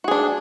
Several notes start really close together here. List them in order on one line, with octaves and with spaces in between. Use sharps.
F#4 G#4 D4